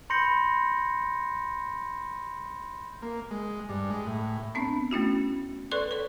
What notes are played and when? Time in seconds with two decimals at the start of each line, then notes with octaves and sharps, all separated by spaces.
0.10 B5 C6 G6 A#6 C#7
3.02 A#3
3.31 G#3
3.69 G2
3.90 G#3
4.07 A2
4.55 B3 C4 D4 B5
4.91 A3 C#4 E4 F#4
5.71 A4 B4 D5 C6 C#6 F#6
5.91 A4 C#5